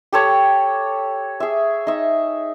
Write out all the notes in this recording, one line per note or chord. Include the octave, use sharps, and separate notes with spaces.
G4 A4 C#5
G#4 E5
D#4 E5